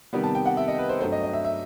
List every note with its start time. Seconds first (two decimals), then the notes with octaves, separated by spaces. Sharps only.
0.13 C3 D#3 G3 B3
0.24 A5
0.35 G5
0.46 F#5
0.57 E5
0.68 D#5
0.79 B4
0.89 C5
1.01 G2 F#3 A3 C5
1.12 D#5
1.23 D#5
1.33 E5
1.45 E5